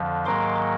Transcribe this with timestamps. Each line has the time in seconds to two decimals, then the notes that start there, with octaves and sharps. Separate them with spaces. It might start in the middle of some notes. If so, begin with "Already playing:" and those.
Already playing: F2 D3 F3
0.26 G#2 D#3 F#3 A#3 C6 D6